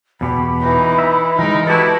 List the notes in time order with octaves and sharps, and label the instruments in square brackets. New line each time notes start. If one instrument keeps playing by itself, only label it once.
[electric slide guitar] E2 B2 G4 [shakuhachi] B5
[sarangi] E3 [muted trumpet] D#4
[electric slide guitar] E5
[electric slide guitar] E3 G#3 [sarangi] D#4 [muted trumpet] A#4
[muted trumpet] E4 [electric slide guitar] F#4 G4 A4 [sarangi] B4 [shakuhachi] A5